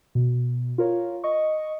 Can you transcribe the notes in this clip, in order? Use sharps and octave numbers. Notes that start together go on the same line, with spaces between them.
B2
F4 A#4 C#5
D#5 C#6